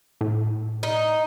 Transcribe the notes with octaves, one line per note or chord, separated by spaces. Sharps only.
A2
D#4